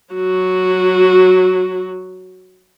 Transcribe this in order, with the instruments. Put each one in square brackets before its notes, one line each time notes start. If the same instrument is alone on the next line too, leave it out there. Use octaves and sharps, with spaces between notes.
[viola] F#3 F#4